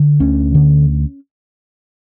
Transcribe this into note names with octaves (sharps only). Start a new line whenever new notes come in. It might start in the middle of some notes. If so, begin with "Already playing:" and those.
Already playing: D3
D2 C#4
D3